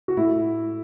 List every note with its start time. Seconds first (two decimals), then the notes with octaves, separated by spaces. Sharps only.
0.08 F#4
0.17 A2 E4